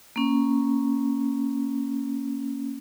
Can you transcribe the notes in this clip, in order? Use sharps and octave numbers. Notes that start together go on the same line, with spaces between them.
A#3 C#4